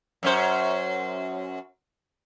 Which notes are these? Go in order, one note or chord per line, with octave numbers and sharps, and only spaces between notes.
F#2 C#4 C5